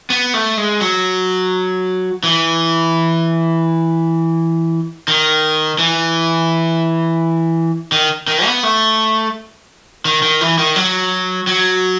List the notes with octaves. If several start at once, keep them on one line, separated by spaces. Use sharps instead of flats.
B3
A3
G#3
F#3
E3
D#3
E3
D#3
D#3
B3
A3
D#3
D#3
E3
D#3
F#3
F#3